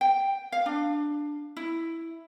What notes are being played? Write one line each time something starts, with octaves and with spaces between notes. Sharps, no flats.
G5
F5
D4
E4